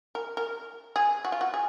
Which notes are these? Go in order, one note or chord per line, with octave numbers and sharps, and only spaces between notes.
A#4
A#4
G#4
F#4
F4
F#4
G#4